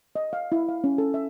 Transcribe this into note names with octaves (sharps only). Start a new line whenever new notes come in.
D#5
F5
E4
F5
C#4
A4
E5